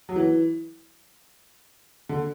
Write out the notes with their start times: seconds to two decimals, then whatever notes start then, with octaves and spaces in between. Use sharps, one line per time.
0.09 F#3
0.16 E3
2.09 D3